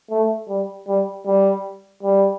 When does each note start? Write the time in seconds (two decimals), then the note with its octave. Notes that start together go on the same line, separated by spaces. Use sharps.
0.11 A3
0.48 G3
0.88 G3
1.26 G3
2.03 G3